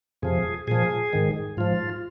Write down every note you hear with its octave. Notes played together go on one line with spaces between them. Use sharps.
F2 C3 F3 G#4
A#2 F3 G#4
G#2 D#3
G#2 F3 F4